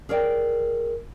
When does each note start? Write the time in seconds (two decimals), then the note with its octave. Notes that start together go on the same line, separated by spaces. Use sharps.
0.09 G#4 A#4 C#5 D5 G5